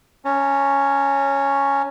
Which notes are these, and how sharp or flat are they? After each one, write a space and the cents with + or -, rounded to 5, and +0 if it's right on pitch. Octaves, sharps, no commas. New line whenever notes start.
C#4 +0 A#5 -40